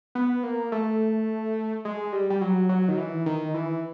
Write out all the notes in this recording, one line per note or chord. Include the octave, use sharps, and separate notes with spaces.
B3
A#3
A3
G#3
G3
G3
F#3
F#3
D#3
E3
D#3
E3